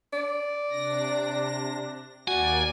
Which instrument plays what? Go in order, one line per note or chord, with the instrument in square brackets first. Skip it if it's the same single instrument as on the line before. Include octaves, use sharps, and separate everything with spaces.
[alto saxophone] D5
[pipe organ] C3 D4 A#6
[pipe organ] D#2 A#3 D5 [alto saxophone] F#4 [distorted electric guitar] G#5